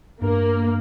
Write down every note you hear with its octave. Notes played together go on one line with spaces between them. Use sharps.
G2 A#3